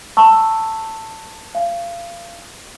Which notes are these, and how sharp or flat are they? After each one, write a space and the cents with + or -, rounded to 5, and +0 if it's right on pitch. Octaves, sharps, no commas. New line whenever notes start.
A5 +15 C#6 -15 E6 +0
F5 -25 G#5 +30